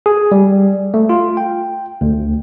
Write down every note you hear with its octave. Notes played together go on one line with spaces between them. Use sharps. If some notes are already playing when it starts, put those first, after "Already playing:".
G#4
G3
A3
F4
G5
D2